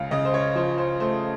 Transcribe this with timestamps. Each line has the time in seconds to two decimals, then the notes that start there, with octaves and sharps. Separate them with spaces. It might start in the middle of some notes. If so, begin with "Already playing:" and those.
Already playing: C#2 C#3 F5
0.11 C#3 D#5
0.25 C5
0.34 C#5
0.55 F3 C5
0.78 C5
1.00 A3 C5